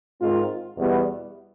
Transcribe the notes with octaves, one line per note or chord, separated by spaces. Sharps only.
G#2 D#3 G#3 C4 F4
E2 B2 G3 B3